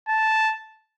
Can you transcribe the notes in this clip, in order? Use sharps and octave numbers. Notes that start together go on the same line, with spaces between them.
A5